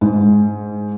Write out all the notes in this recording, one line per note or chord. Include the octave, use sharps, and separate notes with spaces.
G#2